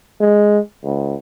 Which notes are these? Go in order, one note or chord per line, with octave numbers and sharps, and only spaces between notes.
G#3
C#2